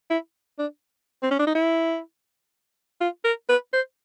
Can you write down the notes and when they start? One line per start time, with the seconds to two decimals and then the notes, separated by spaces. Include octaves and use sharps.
0.10 E4
0.59 D4
1.23 C4
1.31 C#4
1.40 D4
1.47 D#4
1.55 E4
3.01 F4
3.25 A#4
3.49 B4
3.73 C5